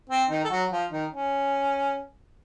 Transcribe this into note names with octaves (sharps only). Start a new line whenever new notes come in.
C4
D#3 D#4
A4
F#3 F#4
F3 F4
D#3 D#4
C#4